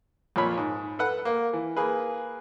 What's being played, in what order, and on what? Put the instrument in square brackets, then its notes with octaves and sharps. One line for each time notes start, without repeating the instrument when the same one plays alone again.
[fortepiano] F2 A#2 F3 C#5 B5
G#2
A4 B4 F#5
A#3
E3
A#3 G#4 B4